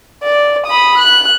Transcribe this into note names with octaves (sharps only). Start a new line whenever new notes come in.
D5
B5 D#6
F#6